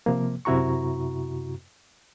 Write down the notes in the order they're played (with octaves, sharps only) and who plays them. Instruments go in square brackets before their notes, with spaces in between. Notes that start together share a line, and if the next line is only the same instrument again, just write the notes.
[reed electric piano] C3 F3 A#3
F#2 C3 E4 F#4 A#5 C#6